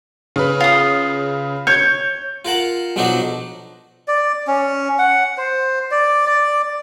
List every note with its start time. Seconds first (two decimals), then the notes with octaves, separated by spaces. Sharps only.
0.36 C#3 B4
0.60 F4 D#6
1.67 C#5 G6
2.45 F4 A#4 F#5 A5
2.96 B1 F3 F#3 D4 D#4 F#4
4.08 D5
4.47 C#4
4.99 F#5
5.38 C5
5.91 D5
6.27 D5